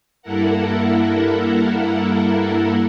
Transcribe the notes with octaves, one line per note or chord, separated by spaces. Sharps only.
G2 A#3 E4 A4 A#4 F#5